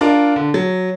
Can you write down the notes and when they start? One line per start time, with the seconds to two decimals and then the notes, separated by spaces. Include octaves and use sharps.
0.01 D4 F4 A#4
0.36 D3
0.54 F#3